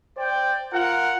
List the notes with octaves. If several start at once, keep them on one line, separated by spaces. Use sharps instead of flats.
C5 D5 G5
F4 A#4 F#5